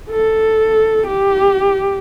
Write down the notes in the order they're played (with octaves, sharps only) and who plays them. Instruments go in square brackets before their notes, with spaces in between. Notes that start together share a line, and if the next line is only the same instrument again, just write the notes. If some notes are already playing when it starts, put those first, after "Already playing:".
[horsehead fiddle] A4
G4